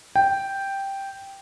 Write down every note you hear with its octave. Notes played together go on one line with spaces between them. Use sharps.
G5